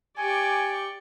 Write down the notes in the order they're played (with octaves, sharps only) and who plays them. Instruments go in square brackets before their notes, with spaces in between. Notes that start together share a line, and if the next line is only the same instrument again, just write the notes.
[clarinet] G4 [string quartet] D5 G5 C#6 [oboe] G#5